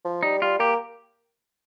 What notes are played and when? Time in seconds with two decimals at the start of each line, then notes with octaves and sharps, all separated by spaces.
0.05 F3
0.23 G3 D#4
0.42 G3 F4
0.59 A#3 G4